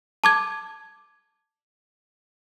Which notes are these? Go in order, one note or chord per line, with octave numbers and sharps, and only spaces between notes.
A5 D6 G#6